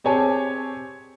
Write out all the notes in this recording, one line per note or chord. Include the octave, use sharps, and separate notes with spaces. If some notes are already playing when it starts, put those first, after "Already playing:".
C4 G4 G#4 C#5 G#5 A5